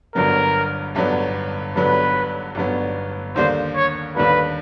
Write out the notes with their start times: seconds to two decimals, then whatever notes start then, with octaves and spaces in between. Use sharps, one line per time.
0.15 G1 G2 D3 F#3 B3 A#4
0.95 G1 G2 D3 F#3 B3
1.75 G1 G2 D3 F#3 B3 B4
2.55 G1 G2 D3 F#3 B3
3.36 D#2 D3 G3 A#3 C5
3.75 C#5
4.16 D#2 D3 G3 A#3 B4